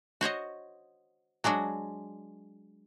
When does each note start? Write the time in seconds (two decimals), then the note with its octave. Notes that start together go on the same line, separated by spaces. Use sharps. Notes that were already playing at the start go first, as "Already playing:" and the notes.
0.21 F#4 C5 C#5 D#5
1.44 F#3 G#3 D4 F#4